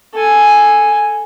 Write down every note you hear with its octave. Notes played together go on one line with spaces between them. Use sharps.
A4 G#5